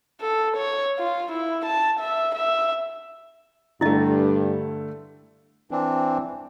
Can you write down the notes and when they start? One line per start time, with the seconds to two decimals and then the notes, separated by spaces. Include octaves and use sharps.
0.21 A4
0.57 C#5
0.99 F4
1.32 E4
1.66 A5
2.00 E5
2.35 E5
3.81 G2 D3 A3 E4 D#5
5.71 E3 C4 D4